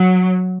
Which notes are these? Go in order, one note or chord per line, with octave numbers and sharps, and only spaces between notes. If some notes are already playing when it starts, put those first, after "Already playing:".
Already playing: F#3